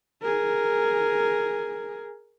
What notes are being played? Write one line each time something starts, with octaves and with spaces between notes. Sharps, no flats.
G#4 A#4